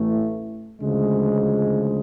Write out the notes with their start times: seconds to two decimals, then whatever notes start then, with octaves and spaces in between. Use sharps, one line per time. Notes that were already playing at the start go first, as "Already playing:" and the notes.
Already playing: A1 A2 E3 A3
0.81 D2 C#3 F3 G#3